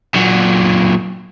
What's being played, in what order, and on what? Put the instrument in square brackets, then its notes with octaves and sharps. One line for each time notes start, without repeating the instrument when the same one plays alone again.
[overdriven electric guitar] A#2 F#3